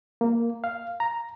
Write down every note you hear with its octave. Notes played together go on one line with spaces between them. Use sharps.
A#3
F5
A#5